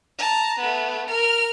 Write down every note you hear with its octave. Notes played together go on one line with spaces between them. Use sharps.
A5 A#5
A3 B3
A#4 F6